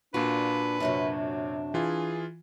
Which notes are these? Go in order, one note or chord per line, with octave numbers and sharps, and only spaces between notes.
A#2 D4 F4 F#4 B4
F#2 C3 F#3 D4
E3 F4 G#4